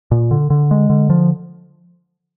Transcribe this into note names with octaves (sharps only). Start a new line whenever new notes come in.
A#2
D3
D3
G#3
D3
F3